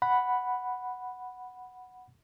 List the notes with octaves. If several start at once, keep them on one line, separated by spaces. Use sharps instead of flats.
F#5 B5